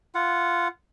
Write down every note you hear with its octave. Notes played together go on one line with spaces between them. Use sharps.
F4 F#5